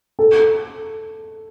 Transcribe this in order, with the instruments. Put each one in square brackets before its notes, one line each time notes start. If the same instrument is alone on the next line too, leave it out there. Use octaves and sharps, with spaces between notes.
[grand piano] A4